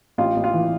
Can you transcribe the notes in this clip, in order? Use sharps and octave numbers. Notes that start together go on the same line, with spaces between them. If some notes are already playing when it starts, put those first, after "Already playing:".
A1 F4
A1
F4
E3